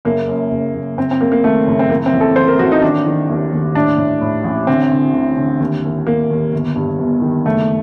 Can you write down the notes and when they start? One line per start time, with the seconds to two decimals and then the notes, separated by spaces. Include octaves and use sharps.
0.05 F#1 A#3
0.28 F#2
0.51 F#1
0.74 F#1
0.97 F#1 C4
1.11 C4
1.21 F#1 A#3
1.32 A#3
1.44 D#3 A3
1.67 F#1
1.79 C4
1.90 A1 A#3
2.06 C4
2.13 A1
2.21 A4
2.36 A1 C5
2.48 A#4
2.59 A1 F#4
2.72 D#4
2.82 D#3 D4
3.06 D#3
3.30 D#2
3.53 D#2
3.75 A2 D4
3.98 A2
4.21 A2
4.44 A1
4.67 D3 C4
4.91 D3
5.14 D2
5.37 D3
5.60 D#2
5.84 D#2
6.07 D#2 A#3
6.30 D#2
6.53 G1
6.76 G2
6.99 G1
7.22 D#3
7.45 F#1 A3